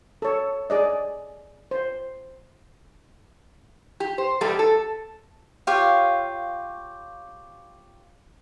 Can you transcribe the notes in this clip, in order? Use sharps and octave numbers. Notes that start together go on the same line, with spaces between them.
A4 C#5
G#4 D5 D#5
C5
G4
C5
B2 G3 A3 G4 A4
A4
F4 G4 C#5 F5